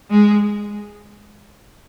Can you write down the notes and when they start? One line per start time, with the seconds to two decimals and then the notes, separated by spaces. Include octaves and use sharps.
0.11 G#3